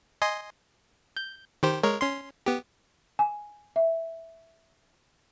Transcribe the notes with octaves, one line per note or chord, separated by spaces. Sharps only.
D#5 G#5 C6
G6
D#3 G4 C5
G#3 A#4 C#5
C#4 C6
B3 G4
G#5
E5